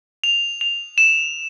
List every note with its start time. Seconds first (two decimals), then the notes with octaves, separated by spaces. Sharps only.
0.24 F7
0.61 F7
0.98 E7